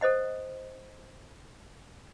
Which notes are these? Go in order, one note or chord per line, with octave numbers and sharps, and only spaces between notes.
A4 C5 D#5 F#5